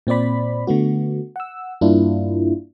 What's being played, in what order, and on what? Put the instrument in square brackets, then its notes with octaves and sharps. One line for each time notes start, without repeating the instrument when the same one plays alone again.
[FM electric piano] A#2 C4 C5 D5 B5
D3 A3 B3 F#4
F#5 E6
G2 A#3 D4 E4 F4